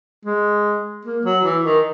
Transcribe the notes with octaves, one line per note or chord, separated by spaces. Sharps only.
G#3
A#3
F#3
E3
D#3